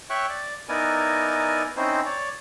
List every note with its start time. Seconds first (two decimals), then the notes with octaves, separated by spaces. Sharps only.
0.10 C#5 E5 G5 C#6 F#6
0.29 D5
0.69 B3 D#4 E4 A#4 D5 G#5
1.77 C4 C#4 D#4 E4 C5
2.05 C#5 D5